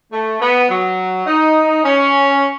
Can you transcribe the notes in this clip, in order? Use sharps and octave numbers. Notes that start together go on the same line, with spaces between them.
A3
B3
F#3
D#4
C#4